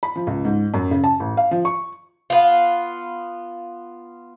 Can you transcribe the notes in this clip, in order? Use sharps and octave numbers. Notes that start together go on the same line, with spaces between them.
B5
F3
C#2
G#2
F#2
C#3
A5
A1
F5
F3
C#6
B3 F4